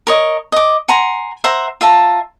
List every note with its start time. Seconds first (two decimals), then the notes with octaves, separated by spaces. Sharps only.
0.07 A#4 C#5 D#5
0.52 D#5 D6
0.88 F#5 G#5 A#5 C6
1.44 C5 E5 F#5 A#5
1.81 F4 E5 A5 A#5